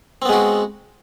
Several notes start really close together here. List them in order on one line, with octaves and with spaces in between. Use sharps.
C4 B3 G#3 F#4